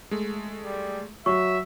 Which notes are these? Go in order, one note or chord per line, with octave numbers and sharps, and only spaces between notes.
G#3 A3
G3
F#3 E5 C#6